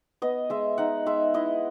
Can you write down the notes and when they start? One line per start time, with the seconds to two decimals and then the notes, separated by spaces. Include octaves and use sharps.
0.22 B3 D#5
0.50 G#3 E5
0.78 D#4 F#5
1.06 G#3 E5
1.34 E4 D#5